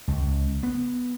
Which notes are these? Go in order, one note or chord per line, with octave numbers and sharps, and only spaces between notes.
C#2
B3